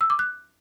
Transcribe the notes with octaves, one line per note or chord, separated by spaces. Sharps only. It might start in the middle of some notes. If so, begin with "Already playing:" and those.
E6
D6
F#6